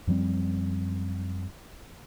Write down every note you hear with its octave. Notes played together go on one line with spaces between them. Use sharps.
F#2 F3 G3 C4